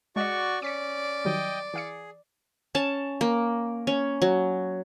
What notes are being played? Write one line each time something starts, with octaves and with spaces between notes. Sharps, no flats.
G#3 F#4 D5 D#5 C#6
C#4 D5 D6 B6 C#7
D#3 F#3 G3 D#5 G5
E3 G#4 F5 C#7
C#4 A5
A#3
C#4
F#3